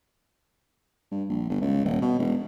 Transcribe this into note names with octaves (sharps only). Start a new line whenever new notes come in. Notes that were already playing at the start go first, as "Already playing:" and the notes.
G2
A#1
G1
C#2
D#1
B2
E1